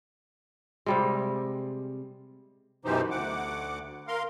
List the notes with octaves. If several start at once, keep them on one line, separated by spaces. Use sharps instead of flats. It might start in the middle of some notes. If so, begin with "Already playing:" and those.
C3 G3 G#3
F#2 B2 E3 D#4 G4 C5
D2 F#5 D6
A#4 F5 C6